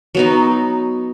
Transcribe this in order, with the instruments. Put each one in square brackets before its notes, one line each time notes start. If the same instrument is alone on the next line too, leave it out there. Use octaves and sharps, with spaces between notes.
[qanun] F#3 B3 D#4